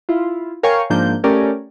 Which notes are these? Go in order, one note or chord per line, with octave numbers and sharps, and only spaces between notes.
E4 F4
A#4 C#5 F5 G5 G#5 C#6
G#2 F3 A#3 D4 G6
A3 C#4 G4 A#4 D5